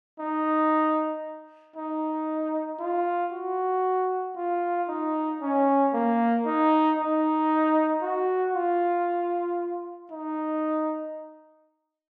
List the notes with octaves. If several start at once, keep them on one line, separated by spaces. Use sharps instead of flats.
D#4
D#4
F4
F#4
F4
D#4
C#4
A#3
D#4
D#4
F#4
F4
D#4